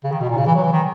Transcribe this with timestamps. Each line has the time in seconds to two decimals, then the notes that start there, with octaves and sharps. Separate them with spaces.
0.04 C#3
0.12 D#3
0.20 B2
0.30 A#2
0.38 C#3
0.46 E3
0.55 F#3
0.64 E3
0.72 D#3